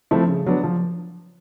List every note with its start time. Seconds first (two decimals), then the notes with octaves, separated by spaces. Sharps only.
0.11 F3 A3 C4 E4
0.28 C#3
0.46 F#3 B3 D4
0.64 F3